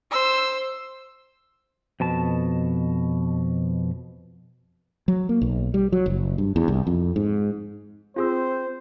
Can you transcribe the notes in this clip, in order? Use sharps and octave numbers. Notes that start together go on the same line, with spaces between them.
C5 E6
F2 B2 A5
F#3
A#3
B1
G3
F#3
F#1
G2
E2
C2
F2
G#2
C4 F4 G#4 C5 E6